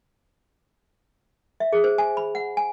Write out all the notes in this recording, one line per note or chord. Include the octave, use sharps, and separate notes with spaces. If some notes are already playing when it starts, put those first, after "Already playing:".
E5
G#4
C5
G#5
B5
F#5
G#5